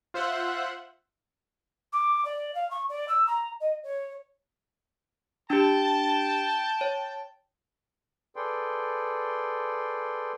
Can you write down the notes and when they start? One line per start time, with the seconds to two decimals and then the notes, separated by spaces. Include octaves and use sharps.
0.14 F4 C5 E5 F#5
1.92 D6
2.25 D5
2.55 F5
2.70 C#6
2.89 D5
3.08 E6
3.27 A#5
3.60 D#5
3.83 C#5
5.50 D4 G4 G5 A5
6.81 C#5
8.36 G#4 A4 B4 D5 G5 C6